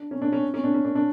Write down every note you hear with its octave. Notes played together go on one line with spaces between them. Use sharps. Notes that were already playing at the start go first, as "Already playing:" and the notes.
Already playing: D4
C#4
D4
C#4
C#4
D4
C#4
D4
D4